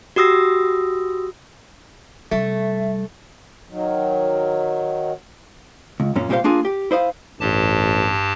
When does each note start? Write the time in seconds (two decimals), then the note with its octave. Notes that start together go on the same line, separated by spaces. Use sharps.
0.16 F#4 G4 D#6 E6 A#6
2.31 C3 G3 A3 E5
3.70 D#3 F#3
6.00 C#2
6.16 F#2 A#2 C#4
6.29 C2 A#2 G4 G#4 C5 F5
6.44 A#3 D4 F4 G#4
6.65 G4
6.91 E4 C5 D#5 F5
7.40 A1 G2 G4 A5